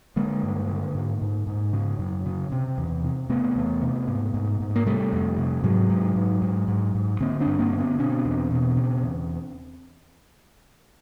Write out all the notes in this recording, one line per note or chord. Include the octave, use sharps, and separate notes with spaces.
D3 G#3 A#3
G2
D3
G#2
G#2
G#2
C#3
F#2
C#3
C3
E2
C3
C3 A3 B3
E2
C3
G#2
G#2
G#2
A#3
C3 G3 A3
F2
C3
G#2 F#3 G#3
G#2
G#2
G#2
G#2
G#2
D3 A#3 C4
C4 D4
G2
A#3 C4
D3
B3 C#4
B2 C4 D4
E2
B2
C#3
E2